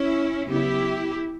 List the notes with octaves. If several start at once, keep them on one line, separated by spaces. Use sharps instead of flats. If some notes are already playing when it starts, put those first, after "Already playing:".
Already playing: C#4 E4
C#3 F#3 B3 E4 G4